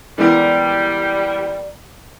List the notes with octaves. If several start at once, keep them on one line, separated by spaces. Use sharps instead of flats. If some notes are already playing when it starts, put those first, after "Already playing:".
E3 G3 G#3 B3 A#4 D5